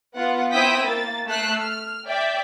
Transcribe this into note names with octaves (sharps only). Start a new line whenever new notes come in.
B3 F4 F#5
C4 E4 G5 D#6 E6 B6
A#3 A6
A3 E6 F#6 C7
F6
D5 E5 G5